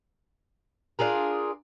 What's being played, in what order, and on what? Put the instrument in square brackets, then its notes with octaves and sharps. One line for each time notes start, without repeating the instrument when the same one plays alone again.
[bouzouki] D4 F4 G#4 A#4